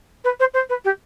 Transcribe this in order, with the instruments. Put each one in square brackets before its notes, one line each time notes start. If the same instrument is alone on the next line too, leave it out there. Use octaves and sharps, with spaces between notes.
[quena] B4
C5
C5
B4
G4